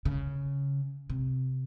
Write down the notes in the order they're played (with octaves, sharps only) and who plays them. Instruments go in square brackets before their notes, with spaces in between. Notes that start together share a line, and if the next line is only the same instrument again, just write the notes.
[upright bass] C#3
C3